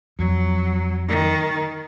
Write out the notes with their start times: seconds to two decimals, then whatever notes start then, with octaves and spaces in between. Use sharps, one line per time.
0.19 F2 F#3
1.08 D#3